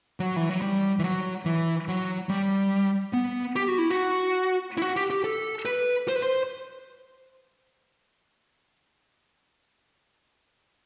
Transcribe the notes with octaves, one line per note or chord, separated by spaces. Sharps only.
F#3
E3
F#3
G3
E3
F#3
E3
F#3
G3
B3
G4
F#4
E4
F#4
E4
F#4
G4
G4
A4
B4
C5
B4
C5